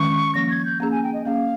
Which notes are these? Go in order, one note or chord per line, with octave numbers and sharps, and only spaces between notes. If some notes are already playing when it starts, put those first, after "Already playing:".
Already playing: D#3 G#3 C#4 C#6
F3 A#3 C#4 A#6
G#6
G6
A#3 C#4 G#4 A#5
G#5
G5
D#5
A#3 C#4 G#4 F5